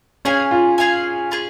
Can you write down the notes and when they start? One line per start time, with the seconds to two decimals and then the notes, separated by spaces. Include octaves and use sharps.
0.25 C#4 G#4 F5 G#5
0.51 F4
0.78 G#4 F5 G#5
1.31 F4 G#4